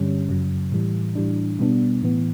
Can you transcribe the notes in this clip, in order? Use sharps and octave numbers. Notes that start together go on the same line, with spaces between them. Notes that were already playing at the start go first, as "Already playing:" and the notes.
Already playing: G2 D3 G3 C#4
F#2 C#3 F#3
A2 E3 G3
A2 E3 G3 D4
B2 G3 B3 D4
A2 E3 B3